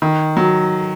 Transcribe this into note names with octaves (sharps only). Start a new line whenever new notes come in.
D#3
F#3